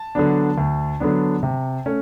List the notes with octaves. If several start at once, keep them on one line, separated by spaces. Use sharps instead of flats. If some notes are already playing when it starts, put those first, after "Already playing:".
Already playing: A5
D3 F#3 B3 D4
D2
D3 F#3 B3 D4
C3
A3 C#4